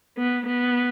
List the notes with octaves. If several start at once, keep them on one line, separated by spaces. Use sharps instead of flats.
B3
B3